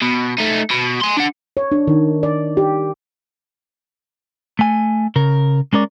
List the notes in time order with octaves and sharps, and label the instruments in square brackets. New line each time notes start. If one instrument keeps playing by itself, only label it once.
[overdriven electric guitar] B2
A3 D#4
B2
G#5 C6
D4 F#5
[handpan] C#5
D4
D#3
D5
G4
[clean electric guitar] A3 G#5
C#3 A#4
G#3 C#4 A#4 D5